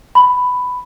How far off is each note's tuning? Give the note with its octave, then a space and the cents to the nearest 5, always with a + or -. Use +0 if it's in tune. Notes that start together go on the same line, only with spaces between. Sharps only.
B5 +10